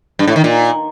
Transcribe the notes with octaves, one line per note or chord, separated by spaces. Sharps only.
G2
A2
D#3
A#2